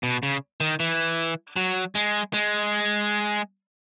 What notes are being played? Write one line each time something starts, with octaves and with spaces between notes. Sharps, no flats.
B2
C#3
D#3
E3
F#3
G#3
G#3